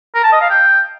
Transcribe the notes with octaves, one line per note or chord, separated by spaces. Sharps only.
A#4
A5
D#5
F5
G5